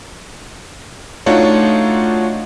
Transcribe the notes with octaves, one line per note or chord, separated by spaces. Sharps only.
A3 D4 D#4 F4 F#4 C#5